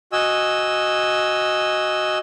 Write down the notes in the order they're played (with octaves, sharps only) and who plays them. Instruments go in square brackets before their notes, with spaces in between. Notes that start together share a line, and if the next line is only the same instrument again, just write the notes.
[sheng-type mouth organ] F#4 D#5 G#5 E6